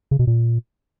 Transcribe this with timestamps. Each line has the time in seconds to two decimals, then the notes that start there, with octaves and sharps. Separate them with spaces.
0.11 C#3
0.19 B2
0.27 A#2